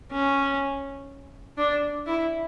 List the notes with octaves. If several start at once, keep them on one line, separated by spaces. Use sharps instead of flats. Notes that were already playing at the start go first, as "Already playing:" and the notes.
C#4
D4
E4